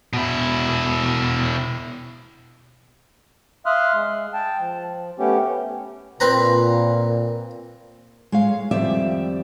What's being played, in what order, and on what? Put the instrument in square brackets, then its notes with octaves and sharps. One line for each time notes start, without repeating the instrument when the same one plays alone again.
[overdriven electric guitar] B2 E4
[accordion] E5 F5 C6 D#6 F6 F#6
G#3
G5 A5
F3
A3 B3 C#4 G4
[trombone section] A#2 [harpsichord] C4 B4 A#5
[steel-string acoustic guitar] G#3 C#5 F5
F2 D#3 G3 D5 E5